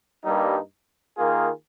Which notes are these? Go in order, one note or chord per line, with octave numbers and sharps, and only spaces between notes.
G2 G3 A#3 D#4
D#3 A#3 F4 G#4